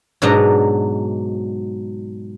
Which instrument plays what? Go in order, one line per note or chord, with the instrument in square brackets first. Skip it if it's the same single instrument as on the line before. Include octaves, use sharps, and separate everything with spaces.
[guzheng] G#2 B2 F#3 D4 D#5 A#5